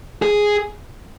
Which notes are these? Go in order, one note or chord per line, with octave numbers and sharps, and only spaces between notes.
G#4